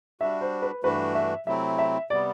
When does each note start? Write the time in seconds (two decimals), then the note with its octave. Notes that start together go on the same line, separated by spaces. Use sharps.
0.20 G3 D4 F#4 E5
0.41 C5
0.62 B4
0.83 G2 E3 A3 D4 F#4 B4
1.15 E5
1.46 C3 F#3 A3 C4 E4 E5
1.78 E5
2.10 C3 G3 B3 D5